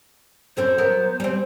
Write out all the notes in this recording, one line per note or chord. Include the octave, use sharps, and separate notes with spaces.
F#2 A3 C4 C5
F#3 B3 A#4
G3 C4